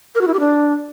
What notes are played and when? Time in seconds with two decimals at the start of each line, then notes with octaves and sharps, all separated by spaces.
0.15 A#4
0.21 F#4
0.28 E4
0.34 G4
0.40 D4